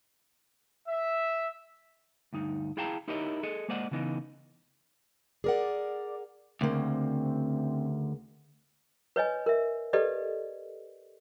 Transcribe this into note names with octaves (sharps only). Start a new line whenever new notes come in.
E5
D2 G2 D#4
E4 G#4 F5 G5 A5 A#5
D#4 E4 G4 A#4 C#5 D#5
G#4 A4 D#5
G#3 A#3 C5 D5 D#5 F#5
C#3 E3 B3 D#4
G#4 A#4 D5 F#5
D2 C#3 A#3 C4
B4 C#5 D#5 G#5
A#4 E5
G4 A4 B4 D5 D#5